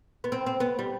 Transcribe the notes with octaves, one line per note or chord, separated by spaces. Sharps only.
B3
C4
C4
B3
G3